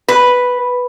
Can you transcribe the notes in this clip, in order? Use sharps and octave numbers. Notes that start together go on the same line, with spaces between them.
B4